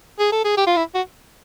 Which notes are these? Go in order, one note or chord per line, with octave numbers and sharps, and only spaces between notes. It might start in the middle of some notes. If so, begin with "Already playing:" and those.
G#4
A4
G#4
G4
F4
E4
F#4